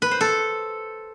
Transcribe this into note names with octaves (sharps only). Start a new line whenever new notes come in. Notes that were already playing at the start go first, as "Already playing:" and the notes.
B4
C5
A4